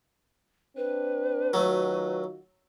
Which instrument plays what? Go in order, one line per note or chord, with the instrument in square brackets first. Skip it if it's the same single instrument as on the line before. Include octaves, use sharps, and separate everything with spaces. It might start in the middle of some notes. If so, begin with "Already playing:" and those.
[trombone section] C4 D4 [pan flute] B4
[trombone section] D#3 F4 F#4 [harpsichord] F#3 A3